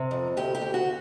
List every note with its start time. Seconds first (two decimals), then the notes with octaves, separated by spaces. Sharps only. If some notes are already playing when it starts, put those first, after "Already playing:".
Already playing: C3
0.11 F2
0.37 D2 G4
0.55 G4
0.61 D2
0.74 F#4